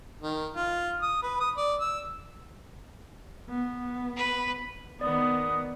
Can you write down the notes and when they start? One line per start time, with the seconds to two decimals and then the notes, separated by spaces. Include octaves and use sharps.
0.21 D#3
0.56 F4
1.02 D#6
1.23 B4
1.40 D#6
1.57 D5
1.81 E6
3.49 B3
4.16 B4
5.01 D#3 B3 D5 D#6